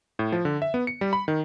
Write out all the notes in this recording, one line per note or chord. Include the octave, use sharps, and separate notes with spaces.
A2
F3
D3
E5
B3
C#7
G3
B5
D#3